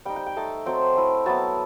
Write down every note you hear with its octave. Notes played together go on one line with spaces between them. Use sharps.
G3 D#4 G5
G5
G5
A3 D#4 A5
F#3 C4 D#4 G5
A3 E4
F#3 B3 E4 A5